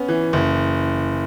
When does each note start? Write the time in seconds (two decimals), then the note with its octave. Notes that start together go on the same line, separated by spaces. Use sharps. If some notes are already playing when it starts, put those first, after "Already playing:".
Already playing: B3 C#4
0.09 E3
0.33 F#1